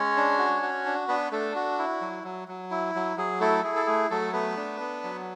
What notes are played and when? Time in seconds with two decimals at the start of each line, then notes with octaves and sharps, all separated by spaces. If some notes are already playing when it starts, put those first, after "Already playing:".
Already playing: G#3 C#4 C#5
0.17 D4
0.39 F#4
0.62 F#4
0.86 D4
1.08 B3 D4 B4
1.31 A3 D4 A4
1.55 F#4
1.79 E4
2.01 F#3
2.24 F#3
2.48 F#3
2.71 E4
2.95 F#3
3.17 F#3 G#4
3.40 A3 E4 A4
3.64 E4 G#4
3.76 A4
3.86 A3 G#4
4.10 F#3 A3 A4
4.33 A3 B3 B4
4.57 D4
4.80 B3
5.04 F#3